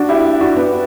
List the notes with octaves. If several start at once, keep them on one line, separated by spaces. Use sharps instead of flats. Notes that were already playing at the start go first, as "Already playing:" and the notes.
Already playing: D4 F#4
E4 G4
D4 F#4
B3 D4